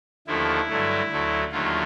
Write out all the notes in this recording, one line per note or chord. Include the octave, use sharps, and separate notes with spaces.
D#2 D3 F3 A3 E4
G2 D3 F#3 A3
D2 D3 F#3 A3
D#2 D3 F#3 A3 F4